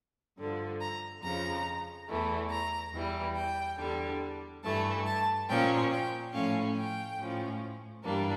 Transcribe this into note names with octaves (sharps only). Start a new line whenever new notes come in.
G2 D3 F3
A#5
F2 C#3 F3 A#5
E2 E3 A3
A#5
E2 E3 G3
G5
E2 D3 G3 D4
G2 E3 A3 A5
A5
A#2 F3 C#4 G5
G5
A2 F3 A3 C#4 F5
G5
A2 F3 C#4
G2 E3 G3 A#3 D4